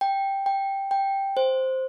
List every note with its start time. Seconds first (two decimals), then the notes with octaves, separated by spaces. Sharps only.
0.01 G5
0.46 G5
0.91 G5
1.37 C5